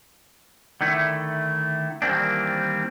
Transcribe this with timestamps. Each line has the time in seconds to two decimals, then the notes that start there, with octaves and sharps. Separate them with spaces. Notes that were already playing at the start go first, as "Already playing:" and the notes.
0.81 D3 D#3 A3 E4
2.02 D#3 E3 G3 A#3 C4 D4